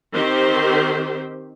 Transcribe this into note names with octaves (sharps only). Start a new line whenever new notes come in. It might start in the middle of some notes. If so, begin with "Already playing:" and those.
D#3 C4 G4 C5